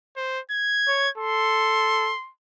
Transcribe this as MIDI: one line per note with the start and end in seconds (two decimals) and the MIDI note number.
0.16 0.39 72
0.51 1.09 92
0.88 1.08 73
1.17 2.13 69
1.17 2.31 84